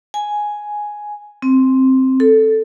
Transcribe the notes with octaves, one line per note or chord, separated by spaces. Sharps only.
G#5
C4
A4